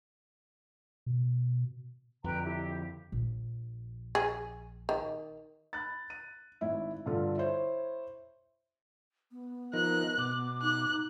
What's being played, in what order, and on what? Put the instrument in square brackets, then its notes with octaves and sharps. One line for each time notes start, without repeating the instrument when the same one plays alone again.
[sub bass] B2
[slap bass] F2 D3 [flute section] B4 G5 A#5
[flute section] E4 G4
[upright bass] A#1
[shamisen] G#4
D#3
[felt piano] B5 F#6 A6
D#7
G#1 E4
G2 D3 F4 A4
E4 C5 C#5
[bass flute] B3
[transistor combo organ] F3 D#4 A#4 [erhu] F#6
[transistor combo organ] B2 [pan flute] D6
[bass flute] D#4 [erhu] F#6